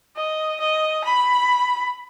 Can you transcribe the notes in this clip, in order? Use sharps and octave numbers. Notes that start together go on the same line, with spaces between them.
D#5
D#5
B5